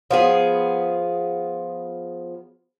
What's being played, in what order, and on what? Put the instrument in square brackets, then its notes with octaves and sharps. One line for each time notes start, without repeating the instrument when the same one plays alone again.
[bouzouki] F3 B3 G#4